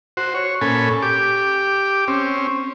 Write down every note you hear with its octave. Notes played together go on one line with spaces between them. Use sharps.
F#4 C5
C#5
A#2 C#4 A4 G#5 B5
G4 D6
C4 C#4